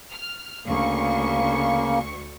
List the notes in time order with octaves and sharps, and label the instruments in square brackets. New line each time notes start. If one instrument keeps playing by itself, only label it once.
[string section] F6
[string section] D2 C#6 [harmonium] C#3 A#3